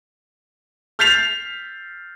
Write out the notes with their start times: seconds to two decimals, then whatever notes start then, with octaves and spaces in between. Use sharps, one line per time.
0.99 F6 G6 A6 B6 C7 F7